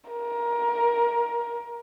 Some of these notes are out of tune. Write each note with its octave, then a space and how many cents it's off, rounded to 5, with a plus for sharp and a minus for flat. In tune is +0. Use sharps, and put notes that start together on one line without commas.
A#4 +20